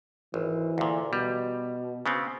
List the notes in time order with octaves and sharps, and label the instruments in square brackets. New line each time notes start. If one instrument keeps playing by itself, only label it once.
[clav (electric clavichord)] G#1 [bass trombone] E3
[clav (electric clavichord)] D2 A#2
[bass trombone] B2 [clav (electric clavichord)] G3
[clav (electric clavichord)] C#3 B3 C4